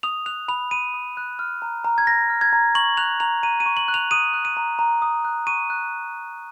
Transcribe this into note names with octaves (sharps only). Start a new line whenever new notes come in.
D#6 F7
F#6 F7
B5 F7
B5 D#7
D#6
F#6
F6
A#5
A#5
G#6
F6 A#6
F6
G#6
A#5
C#6 F#7
F#6 F7
A#5 F7
A#5 D#7
D#7
C#6
F#7
F#6
F7
D#6 D#7
F#6
D#7
A#5
A#5
D#6
F#6
C#6 D#7
F#6